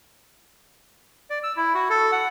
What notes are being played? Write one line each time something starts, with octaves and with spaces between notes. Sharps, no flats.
D5
E6
E4
F#4
A4
F#5